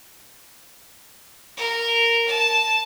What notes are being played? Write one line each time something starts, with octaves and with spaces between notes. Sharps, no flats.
A#4
A5